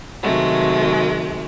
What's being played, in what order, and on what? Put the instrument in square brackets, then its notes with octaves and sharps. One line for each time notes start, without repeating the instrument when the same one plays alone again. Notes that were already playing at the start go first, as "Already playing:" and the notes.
[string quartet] C3 D#3 F#3 G#3 A3